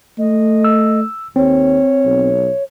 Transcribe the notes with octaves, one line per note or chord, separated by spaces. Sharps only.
A3 D#5
E6
D#2 C4 C#5
B1